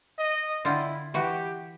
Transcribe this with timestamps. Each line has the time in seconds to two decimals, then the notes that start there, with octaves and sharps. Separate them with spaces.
0.18 D#5
0.65 D3 E4 F4 G5
1.14 E3 F#4 G4